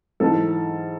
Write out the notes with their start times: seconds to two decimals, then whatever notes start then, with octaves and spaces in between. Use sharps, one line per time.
0.20 G#2 E3 A4